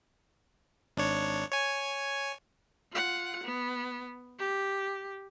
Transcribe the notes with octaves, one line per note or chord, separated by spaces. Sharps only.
G#1 D4 C#5
C#5 G#5
F4 F#5
B3
G4